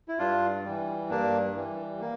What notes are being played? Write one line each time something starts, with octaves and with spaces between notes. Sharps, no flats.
E4
G2 D4 F4
E3 G3
G2 A#3 D4
E3 G3
A#3